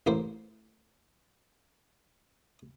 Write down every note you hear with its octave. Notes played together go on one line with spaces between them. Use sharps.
A1 A2 A#3 C5 C6